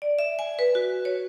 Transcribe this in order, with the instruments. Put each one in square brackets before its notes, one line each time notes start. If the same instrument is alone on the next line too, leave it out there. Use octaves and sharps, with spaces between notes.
[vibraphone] D5
E5
G#5
B4
F#4
C#5